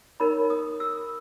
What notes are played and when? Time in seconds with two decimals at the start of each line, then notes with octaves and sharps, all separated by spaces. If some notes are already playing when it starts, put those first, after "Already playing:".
0.20 D#4 A#4 C#5 B5
0.50 D#6
0.80 E6